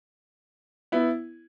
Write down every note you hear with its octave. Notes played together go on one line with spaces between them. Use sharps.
B3 E4